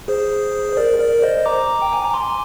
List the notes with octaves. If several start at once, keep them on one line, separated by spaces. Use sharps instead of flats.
G#4 C5
C5
A#4 D5
A#4 D5
C5 D#5
A#5 D6
G5
G#5
A#5
G#5 C6